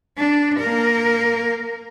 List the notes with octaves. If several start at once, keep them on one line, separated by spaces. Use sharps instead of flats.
D4
A#3 A#4